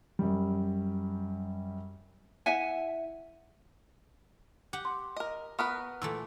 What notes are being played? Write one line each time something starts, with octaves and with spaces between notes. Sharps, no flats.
F#2 G3
E4 E5 F#5 G#5
G4 F#5
C6 D6
A#4 D#5
B3 A#4 B4 C#6 D#6 F6
A#2 E3 A3 E6